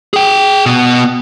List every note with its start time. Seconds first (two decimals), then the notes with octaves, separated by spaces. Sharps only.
0.14 G#4 G5
0.66 B2 B3